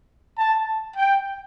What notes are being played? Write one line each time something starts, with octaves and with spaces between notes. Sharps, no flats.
A5
G5